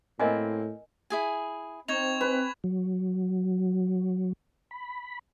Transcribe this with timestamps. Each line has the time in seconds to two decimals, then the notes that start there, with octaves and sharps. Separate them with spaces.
0.19 A2 A#3 C4 E4 A#4 D#5 G#5
1.10 E4 G#4 G#5
1.88 C4 D#4 C#6 G#6 F7
2.21 B4
2.64 F#3
4.71 B5